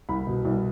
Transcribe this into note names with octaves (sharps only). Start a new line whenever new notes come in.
C2 B5
B2
C2